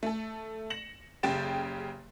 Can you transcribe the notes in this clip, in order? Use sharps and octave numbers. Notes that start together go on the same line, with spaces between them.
A3 A4
A#6 C#7 E7 F#7
F#1 C#3 G4 G5 A6 E7